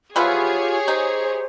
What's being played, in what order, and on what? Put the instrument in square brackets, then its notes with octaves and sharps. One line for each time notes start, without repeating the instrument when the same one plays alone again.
[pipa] E3 F3 B3 [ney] F4 [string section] G4 G#4 C#5
[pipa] D#4 [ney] C5